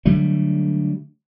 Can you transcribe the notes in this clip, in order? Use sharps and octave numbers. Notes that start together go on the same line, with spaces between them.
D3 F#3 G3 A3